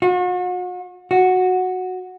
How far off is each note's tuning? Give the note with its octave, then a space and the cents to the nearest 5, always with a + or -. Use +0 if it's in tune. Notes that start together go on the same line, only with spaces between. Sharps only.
F#4 -40
F#4 -5